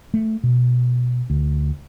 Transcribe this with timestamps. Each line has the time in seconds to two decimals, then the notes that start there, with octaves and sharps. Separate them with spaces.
0.14 A3
0.44 B2
1.30 D2